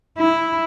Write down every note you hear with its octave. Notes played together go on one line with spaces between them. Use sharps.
E4